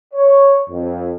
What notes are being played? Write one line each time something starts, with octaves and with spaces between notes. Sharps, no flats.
C#5
F2